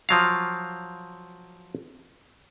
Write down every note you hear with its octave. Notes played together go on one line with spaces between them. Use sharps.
F3 F#3 F5